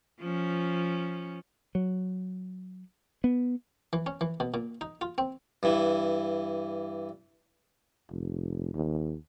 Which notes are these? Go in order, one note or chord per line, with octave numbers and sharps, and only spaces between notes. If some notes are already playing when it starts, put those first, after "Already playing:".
F3 C#4
F#3
B3
E3
C#4
E3
B2
A#2
D#4
F4
C4
G2 E3
F1
D#2